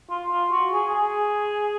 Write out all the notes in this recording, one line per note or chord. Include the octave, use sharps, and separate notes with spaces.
F4
F4
F#4
G#4
G#4